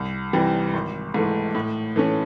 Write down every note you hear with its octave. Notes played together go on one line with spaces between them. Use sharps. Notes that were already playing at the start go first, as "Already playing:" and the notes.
Already playing: C2
C3 E3 G3
G#1
G#2 E3 A3
A2
E3 A3 C#4